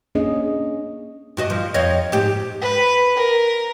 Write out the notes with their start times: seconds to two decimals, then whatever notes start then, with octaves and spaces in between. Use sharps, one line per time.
0.15 A#3 C#4 D4 G#4 D#5
1.37 G2 F#4 D#5
1.50 F3
1.74 F2 C#5 D#5
2.12 G#2 G4
2.61 B4
3.17 A#4